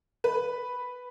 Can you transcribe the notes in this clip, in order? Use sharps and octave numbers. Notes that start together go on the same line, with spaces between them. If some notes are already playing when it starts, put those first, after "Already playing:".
B4